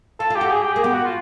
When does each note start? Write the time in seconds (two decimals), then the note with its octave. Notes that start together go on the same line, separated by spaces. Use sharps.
0.20 F4 A4
0.30 F4
0.36 G4
0.41 F#4
0.46 G4
0.51 G#4
0.62 G4
0.73 A#3 G#4
0.83 B3 G4
0.94 F#4
1.05 F4